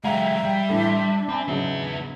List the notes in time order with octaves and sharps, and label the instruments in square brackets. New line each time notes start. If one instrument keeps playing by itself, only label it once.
[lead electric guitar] F#3 G#3 [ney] E5 [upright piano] F5 A#5 [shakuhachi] G5
[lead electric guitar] G3 [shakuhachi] G5
[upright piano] A2 E3 [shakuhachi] D4
[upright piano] C6
[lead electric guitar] C4 [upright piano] G#5 B5
[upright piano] G#2 C#3 F#3 [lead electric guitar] B3 E5 [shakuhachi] D4